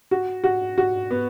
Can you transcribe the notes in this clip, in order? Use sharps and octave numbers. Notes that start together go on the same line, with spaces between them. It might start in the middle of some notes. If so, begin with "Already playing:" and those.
F#4
F#4
F#4
B3